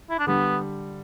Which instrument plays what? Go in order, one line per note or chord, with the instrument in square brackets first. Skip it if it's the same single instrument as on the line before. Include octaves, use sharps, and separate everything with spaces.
[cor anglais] E4
D4
[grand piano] D3 G3 [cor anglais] B3